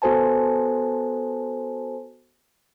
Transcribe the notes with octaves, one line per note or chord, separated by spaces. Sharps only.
B3 F#4 A4 C5 G#5 A5